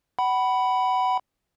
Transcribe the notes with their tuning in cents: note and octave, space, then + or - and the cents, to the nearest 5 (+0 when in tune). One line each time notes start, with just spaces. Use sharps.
F#5 +30 B5 +0